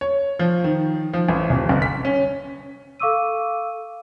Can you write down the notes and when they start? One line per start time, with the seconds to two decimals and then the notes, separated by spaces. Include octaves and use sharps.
0.01 C#5
0.39 F3
0.64 D#3
1.13 F3
1.29 A1
1.50 D#1
1.69 G1
1.82 B6
2.05 C#4
3.00 A4 F5 C#6 D6 E6 D#7